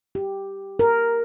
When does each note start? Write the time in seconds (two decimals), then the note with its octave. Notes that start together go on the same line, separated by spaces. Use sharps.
0.15 G4
0.79 A#4